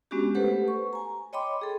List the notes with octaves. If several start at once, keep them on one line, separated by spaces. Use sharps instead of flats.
G#3 B3 C#4 D4 F#4 G4
A3 G4 A4 B4 C5 F#5
C#6
G#5 A#5
C#5 D#5 G5 B5 C6 D6
G#4 A4